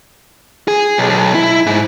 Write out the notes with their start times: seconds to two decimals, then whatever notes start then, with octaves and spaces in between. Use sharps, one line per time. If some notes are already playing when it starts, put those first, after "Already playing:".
0.68 G#4
0.98 B1
1.09 B1
1.34 E4
1.66 G#2